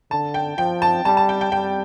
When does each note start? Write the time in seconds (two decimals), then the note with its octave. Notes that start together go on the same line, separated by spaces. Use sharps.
0.11 D3 A5
0.34 G5
0.57 F3 G5
0.82 A5
1.05 G3 A5
1.17 A5
1.29 G5
1.41 G5
1.52 G3 G5